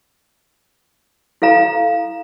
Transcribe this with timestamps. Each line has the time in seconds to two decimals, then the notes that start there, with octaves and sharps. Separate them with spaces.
1.42 E4 A4 F5 A#5